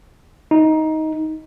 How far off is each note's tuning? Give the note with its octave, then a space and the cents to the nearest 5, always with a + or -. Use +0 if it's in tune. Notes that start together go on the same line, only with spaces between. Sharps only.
D#4 +15